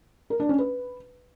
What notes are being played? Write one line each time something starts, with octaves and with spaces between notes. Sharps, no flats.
A#4
D4
C#4
B4